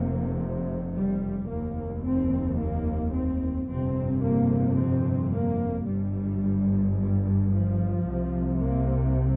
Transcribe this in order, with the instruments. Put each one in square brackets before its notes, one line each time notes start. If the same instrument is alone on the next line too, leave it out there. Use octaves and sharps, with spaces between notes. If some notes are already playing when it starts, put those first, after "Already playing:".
Already playing: [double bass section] F1 F2 C3 A#3
G3
F1 D#2 A#3
C4
A#3
C4
G1 F2 C3 C4
A#3
C4
A#3
G1 G2 G3
G3
F3
C2 C3
A#3